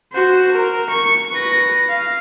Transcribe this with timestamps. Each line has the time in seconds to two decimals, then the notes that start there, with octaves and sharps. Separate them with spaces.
0.12 F#4 C5
0.52 A#4
0.90 C#6
1.32 B4 A#6
1.89 F5